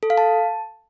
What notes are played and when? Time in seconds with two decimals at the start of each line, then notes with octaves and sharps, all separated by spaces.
0.03 A4
0.10 F5
0.18 A5